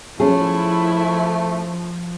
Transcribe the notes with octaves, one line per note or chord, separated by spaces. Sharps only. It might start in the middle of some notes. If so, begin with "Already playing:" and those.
F3 A3 C#4 E4 G#4